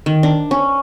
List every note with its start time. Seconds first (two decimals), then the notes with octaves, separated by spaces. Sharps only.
0.06 D#3
0.23 D4
0.51 C#4